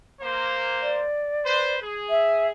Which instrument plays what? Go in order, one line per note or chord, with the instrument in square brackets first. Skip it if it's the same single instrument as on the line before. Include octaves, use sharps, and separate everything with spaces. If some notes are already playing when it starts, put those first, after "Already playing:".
[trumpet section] A#3 C5
[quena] D5
[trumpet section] B4 C5
G#4
[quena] E5